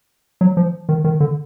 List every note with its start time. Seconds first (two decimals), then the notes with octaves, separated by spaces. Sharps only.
0.41 F#3
0.57 F3
0.89 D#3
1.04 D#3
1.20 D3